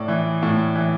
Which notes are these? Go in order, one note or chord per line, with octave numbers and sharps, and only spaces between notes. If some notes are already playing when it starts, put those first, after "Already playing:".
Already playing: A2 D5
E3
A2
E3